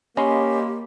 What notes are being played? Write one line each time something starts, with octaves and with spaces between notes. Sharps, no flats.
A#3 C#4 G4 D#5 B5 C6